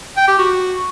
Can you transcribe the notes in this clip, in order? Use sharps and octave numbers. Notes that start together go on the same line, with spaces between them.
G5
G4
F#4